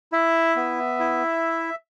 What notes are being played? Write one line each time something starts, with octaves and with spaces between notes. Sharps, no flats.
E4 E5
B3
E4